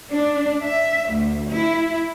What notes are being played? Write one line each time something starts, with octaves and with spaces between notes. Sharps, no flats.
D4
E5
D2
E4